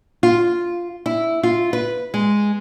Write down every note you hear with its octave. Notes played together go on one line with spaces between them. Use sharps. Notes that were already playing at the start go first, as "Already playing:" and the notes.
F4
E4
F4
B4
G#3